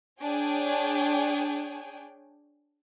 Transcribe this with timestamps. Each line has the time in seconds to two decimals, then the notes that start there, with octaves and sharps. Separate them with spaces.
0.22 D4 G#4 C#5 G5 G#5